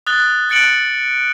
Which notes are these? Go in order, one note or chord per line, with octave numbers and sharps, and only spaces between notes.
D#6 F#6 A6 G7
F#6 A6 C#7 D7 F#7